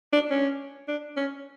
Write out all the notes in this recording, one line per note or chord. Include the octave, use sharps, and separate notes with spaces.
D4
C#4
D4
C#4